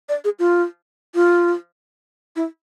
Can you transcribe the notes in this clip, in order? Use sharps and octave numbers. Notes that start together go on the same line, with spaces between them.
D5
G#4
F4
F4
E4